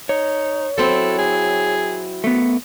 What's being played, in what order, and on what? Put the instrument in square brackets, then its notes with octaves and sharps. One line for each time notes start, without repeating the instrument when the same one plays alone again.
[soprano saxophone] D#4 [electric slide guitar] C#5
[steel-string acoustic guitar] F#3 C4 E4 [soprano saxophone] A4
[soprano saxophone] G#4
[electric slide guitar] A3 B3